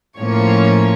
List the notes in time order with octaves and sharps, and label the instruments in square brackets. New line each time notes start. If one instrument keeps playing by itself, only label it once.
[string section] A2 F3 A#3 C#4 C#5